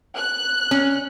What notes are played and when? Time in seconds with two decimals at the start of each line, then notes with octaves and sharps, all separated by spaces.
0.17 F#6
0.71 C#4